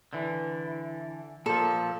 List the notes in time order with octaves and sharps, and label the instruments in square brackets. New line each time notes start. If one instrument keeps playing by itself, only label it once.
[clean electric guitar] D3 E3
[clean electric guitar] A#2 F3 [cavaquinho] A4